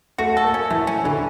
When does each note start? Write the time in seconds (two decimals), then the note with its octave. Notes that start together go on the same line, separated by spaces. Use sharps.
0.18 A3 F#4
0.37 A4
0.45 A#3
0.54 C#4
0.70 E3 A3
0.87 C#4
1.05 D3 E3